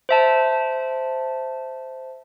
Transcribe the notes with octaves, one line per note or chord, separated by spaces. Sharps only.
C5 E5 A5